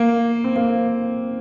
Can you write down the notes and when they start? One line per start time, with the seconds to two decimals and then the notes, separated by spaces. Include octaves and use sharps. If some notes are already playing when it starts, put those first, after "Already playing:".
Already playing: A#3
0.44 C4
0.56 A#3